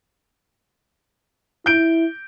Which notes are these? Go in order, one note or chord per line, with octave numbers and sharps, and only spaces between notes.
E4 G6 D7